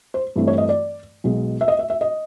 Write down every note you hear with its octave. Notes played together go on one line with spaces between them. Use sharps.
C5
G2 E3 A3 C4
C#5
D#5
D5
B1 B2 G#3
E5
D#5
E5
E5
D#5